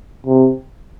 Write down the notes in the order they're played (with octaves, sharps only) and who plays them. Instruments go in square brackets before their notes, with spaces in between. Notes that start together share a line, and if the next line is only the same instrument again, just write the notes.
[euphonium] C3